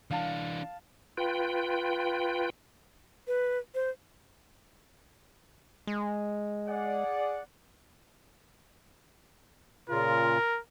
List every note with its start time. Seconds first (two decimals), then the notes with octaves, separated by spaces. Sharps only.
0.11 E3 D4 F5 A5
1.17 F4 B4 G5
3.28 B4
3.75 C5
5.87 G#3
6.68 G#4 D5 F#5
9.89 A#2 C#3 F4 A#4